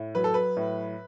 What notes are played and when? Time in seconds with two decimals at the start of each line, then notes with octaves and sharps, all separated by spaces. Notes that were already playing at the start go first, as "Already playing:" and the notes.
Already playing: A2
0.15 F#3 B4
0.24 A4
0.34 B4
0.57 A2